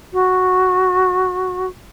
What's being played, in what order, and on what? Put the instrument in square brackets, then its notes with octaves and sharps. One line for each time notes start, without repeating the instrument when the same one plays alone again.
[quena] F#4